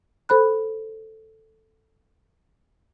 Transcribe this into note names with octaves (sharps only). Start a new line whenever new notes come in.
A4 C5 B5 F#6